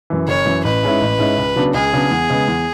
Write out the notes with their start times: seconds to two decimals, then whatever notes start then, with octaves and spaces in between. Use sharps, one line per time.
0.10 F#2 E3
0.27 F#1 C#5
0.46 F#2 E3
0.64 A1 B4
0.83 G#2 G#3 C#4 E4
1.01 A1
1.19 G#2 G#3 C#4 E4
1.38 C#2
1.56 C#3 F#3 B3 D4
1.74 C#2 G#4
1.93 C#3 F#3 B3 D4
2.11 E2
2.30 C#3 G#3 B3
2.48 E2